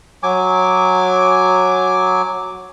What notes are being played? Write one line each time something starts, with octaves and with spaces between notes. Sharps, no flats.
F#3 G#5 D6